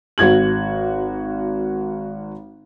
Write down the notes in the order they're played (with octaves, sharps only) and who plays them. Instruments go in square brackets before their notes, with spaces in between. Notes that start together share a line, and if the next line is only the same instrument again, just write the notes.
[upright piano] G#1 F#4 G#6 F#7